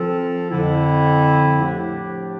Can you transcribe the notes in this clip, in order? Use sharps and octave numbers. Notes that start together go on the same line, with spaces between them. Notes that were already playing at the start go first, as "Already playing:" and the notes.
Already playing: F3 C4 F4 A4
F2 D3 F3 C4 E4
A2 F3 A3 D4 G4